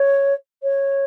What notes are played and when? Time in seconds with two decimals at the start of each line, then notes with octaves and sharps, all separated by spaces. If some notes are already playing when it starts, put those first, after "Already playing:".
Already playing: C#5
0.62 C#5